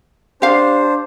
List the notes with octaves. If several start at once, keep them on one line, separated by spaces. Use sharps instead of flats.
D4 G4 C5 F5